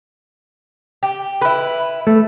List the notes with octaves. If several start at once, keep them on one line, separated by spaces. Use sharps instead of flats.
G4
E4 B4
A3